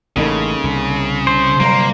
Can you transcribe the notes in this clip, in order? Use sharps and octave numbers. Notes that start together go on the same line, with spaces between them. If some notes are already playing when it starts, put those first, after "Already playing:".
A1 C#3 A#3 D#4 A4
C2
C5
G1 C3 F#3 G3 A#3 A#5